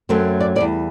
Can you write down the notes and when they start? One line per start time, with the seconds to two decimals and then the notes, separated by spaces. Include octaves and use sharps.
0.09 F#2 F#3 A3 C4
0.40 D5
0.56 B2 G3 D5
0.61 E2